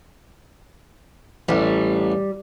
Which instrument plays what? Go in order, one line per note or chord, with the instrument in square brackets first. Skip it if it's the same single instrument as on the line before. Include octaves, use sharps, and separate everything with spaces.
[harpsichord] A1 [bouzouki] G3